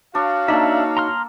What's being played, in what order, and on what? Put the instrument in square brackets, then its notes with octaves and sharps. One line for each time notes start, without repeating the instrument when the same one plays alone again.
[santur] D4 [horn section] F#4 C#5 F5
[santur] A#3 A4 [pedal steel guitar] D4 E5 [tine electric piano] D#4
[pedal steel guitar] A#5 C6 F6